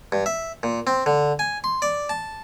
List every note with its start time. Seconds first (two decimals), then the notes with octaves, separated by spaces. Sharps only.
0.12 G2
0.26 E5
0.63 A#2
0.87 C4
1.06 D3
1.39 G#5
1.64 C6
1.82 D5
2.09 A5